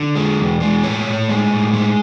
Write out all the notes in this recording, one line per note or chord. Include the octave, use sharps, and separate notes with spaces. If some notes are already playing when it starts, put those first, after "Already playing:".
Already playing: D3
G#3
E2
G#3
A2 C#5
A2
G#3
A2
G#3